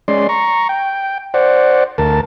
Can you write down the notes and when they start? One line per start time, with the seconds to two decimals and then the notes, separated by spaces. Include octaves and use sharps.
0.08 G#3 C#4 D5 C6
0.29 A#5 C#6
0.69 G5
1.34 C5 D5 F#5
1.98 D2 A#4 A5